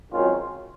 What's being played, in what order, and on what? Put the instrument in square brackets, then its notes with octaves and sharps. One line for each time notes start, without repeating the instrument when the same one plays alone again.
[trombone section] G#1 F#2 D#3 C#4 F4